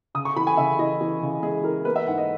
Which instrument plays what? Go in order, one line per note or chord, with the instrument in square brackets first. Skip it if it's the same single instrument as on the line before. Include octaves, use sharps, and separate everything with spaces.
[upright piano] C#3 D#6
C#6
E3 B5
G#5
C#3 E5
E3 D#5
E3
C#3
G#3 G#4
E3 A#4
A#3 B4
E5
G#2 F#5
D#5